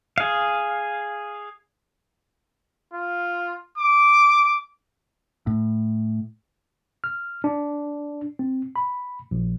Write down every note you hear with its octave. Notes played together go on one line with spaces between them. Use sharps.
G#4 F5
F4
D6
A2
F6
D4
C4
B5
A#1